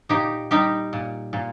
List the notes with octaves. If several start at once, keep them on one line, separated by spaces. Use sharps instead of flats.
A#2 D#4 G4
G3 D#4 G4
A#2
A#2